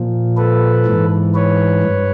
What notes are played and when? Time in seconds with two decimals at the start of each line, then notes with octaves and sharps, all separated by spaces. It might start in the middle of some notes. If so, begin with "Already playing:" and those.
Already playing: A#2 F3
0.37 A4 B4
0.86 G#2 E3
1.35 B4 C#5
1.83 G2